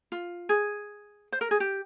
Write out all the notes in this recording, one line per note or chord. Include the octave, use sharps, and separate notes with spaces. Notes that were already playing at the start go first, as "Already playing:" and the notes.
F4
G#4
C5
A#4
G#4
G4